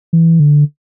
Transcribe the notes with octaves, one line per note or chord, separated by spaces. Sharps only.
E3
D3